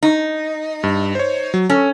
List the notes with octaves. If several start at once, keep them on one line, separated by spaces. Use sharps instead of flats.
D#4
G2
C5 C#5
F#3
C#4 A4